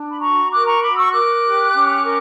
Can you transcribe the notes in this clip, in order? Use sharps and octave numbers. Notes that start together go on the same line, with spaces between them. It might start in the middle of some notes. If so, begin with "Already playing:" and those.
Already playing: D4
B5
F#4 A#5 C#6
A#4 D6 F#6
A#5 C#6
F#4 B5 D6
C#6 E6
A#4 D6 F#6
G4
C#4
A#4